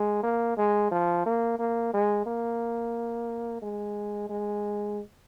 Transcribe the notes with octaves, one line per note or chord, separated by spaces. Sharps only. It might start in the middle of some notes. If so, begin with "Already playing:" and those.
Already playing: G#3
A#3
G#3
F3
A#3
A#3
G#3
A#3
G#3
G#3